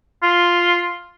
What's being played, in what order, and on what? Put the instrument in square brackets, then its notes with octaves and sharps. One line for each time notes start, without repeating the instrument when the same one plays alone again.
[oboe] F4